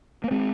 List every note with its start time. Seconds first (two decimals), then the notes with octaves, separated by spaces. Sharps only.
0.24 A#3
0.31 G#3 C4